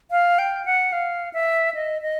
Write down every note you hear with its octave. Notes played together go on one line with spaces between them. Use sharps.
F5
G5
F#5
F5
E5
D#5
D#5